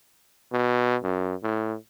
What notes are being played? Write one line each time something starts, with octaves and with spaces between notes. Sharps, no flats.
B2
F#2
A2